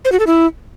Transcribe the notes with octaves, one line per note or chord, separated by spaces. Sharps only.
C5
F#4
A4
E4